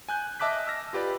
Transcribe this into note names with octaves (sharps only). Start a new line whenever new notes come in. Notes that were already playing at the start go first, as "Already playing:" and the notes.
G#5 F#6 G6
D#5 E5 A5 D6 F#6 B6
E6 F6 A#6
F4 G4 B4 D5